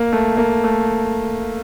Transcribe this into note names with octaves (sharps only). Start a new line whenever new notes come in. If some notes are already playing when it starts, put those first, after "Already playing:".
Already playing: A#3
A3
A#3
A3